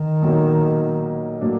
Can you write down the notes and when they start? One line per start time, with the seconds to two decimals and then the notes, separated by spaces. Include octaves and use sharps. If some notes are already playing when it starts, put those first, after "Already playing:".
Already playing: D#3
0.22 B1 A#2 F#3 A#3 D#4
1.41 A2 F#3 A#3 D4